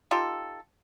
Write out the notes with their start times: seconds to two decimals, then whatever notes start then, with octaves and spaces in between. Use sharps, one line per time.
0.11 D#4 F4 G4 A4